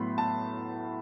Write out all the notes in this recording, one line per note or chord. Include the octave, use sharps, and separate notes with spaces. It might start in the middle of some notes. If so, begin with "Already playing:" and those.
Already playing: A2 F#3 B3 B5 C6
A5